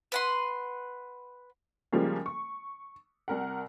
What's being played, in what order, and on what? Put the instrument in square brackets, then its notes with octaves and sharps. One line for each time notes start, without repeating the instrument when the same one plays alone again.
[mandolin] B4 F#5 C6
[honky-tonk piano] C#3 F3 G3 G#3 A#3
C#6
C2 A#4 F#5